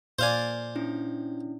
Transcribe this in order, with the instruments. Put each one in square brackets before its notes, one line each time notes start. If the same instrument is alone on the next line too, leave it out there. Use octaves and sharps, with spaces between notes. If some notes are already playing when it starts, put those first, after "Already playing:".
[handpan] A#2 D5 [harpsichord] C5 F5 G#5
[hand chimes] C#4 D4 E4